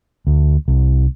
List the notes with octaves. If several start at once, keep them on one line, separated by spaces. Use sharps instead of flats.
D2
C2